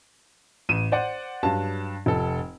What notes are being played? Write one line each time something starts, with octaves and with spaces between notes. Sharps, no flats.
A1 D#7 E7
C5 D5 F#5
G2 F#3 F5 A5
F1 A4